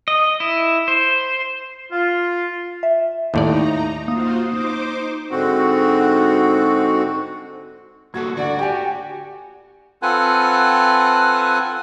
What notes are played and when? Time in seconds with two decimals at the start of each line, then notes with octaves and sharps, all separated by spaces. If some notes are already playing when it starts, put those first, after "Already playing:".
0.08 D#5
0.40 E4
0.88 C5
1.91 F4
2.83 E5
3.34 D#2 A2 D#4 D5 A#5
4.08 A#3 F4 F#4 C5 D#6
4.47 D#4 C5 D6
5.31 G#2 D3 C4 F#4
8.14 G2 A#3 F#4 A4 G#6
8.37 D2 F#4 D5
8.59 G4 G5 G#5
10.02 C4 F4 A4 B4 F#5 G#5